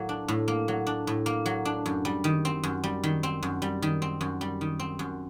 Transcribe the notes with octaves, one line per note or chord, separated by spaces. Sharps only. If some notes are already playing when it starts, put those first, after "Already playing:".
Already playing: A2 F#3 A#3
D4
A2
A#3
F#3
D4
A2
A#3
F#3
D4
F#2
G3
D#3
C4
F#2
G3
D#3
C4
F#2
G3
D#3
C4
F#2
G3
D#3
C4
F#2